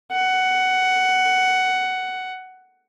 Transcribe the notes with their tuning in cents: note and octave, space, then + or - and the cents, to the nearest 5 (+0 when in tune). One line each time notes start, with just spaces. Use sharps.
F#5 +10